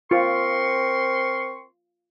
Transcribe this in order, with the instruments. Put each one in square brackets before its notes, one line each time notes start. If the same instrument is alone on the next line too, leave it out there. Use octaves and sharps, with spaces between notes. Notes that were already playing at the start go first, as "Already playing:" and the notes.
[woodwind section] C4 A#4 C#6 [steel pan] F4 [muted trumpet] C6